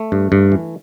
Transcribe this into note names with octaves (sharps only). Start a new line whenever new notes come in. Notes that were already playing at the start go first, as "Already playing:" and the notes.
Already playing: A3
G2
G2
E3